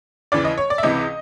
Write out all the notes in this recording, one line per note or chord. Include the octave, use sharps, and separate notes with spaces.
D#2 C#3 E3 D5
D#5
C#5
D5
E5
C#2 C3 E3 D#5